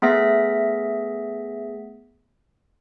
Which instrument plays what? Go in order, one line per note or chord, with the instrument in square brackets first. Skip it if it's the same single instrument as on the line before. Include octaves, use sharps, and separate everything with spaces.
[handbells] A3 B3 G#4 E5 A#6 B6